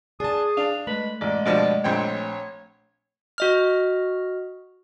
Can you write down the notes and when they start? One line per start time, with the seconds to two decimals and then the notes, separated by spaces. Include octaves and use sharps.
0.20 D4 G#4 A5 D#6
0.57 D4 F5
0.87 G#3 A3 B4
1.21 A1 G#3 D5
1.46 G2 B2 F3 D5
1.84 A#1 C4 C#5 G5
3.38 F#4 D#5 F6